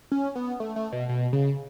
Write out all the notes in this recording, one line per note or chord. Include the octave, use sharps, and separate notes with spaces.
C#4
B3
A3
A3
B2
B2
C#3